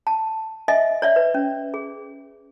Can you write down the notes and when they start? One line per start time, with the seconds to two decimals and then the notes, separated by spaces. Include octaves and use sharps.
0.07 A5
0.68 D#5 E5 G#5
1.02 C#5 D5 E5
1.16 B4
1.34 C#4
1.74 G#4